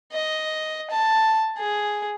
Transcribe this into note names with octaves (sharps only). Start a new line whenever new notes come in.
D#5
A5
G#4